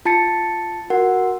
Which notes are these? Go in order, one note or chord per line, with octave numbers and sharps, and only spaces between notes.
F4 A5 A6 C#7
F#4 A#4 F#5